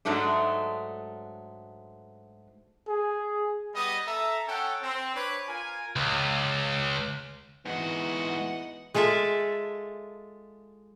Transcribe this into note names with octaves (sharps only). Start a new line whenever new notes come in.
G#2 F#3 G#3 A3 D4
G#4
G3 B3 D#5
A4 E5 A#5
C#4 A4 F#5 G5
C4
D4 B4 C#5 D6
F4 A#4 G#5
C#2
G#2 E3 B3 F#4 D#5 F#5
G#3 F4 A4 E5 A5